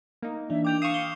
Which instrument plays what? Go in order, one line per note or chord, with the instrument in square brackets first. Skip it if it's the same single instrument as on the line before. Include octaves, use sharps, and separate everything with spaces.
[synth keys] A#3 D#4
[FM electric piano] E3 D4 [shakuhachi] E5
[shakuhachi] G5 [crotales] D6 G6 F7
[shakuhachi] F5 [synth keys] C#6 D#6 [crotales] C7 E7 F7
[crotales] G7